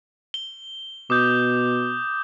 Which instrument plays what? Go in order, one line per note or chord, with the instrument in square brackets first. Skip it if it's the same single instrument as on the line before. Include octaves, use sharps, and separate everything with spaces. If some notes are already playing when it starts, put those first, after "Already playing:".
[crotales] G7
[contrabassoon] B2 [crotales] D6 D#6 G6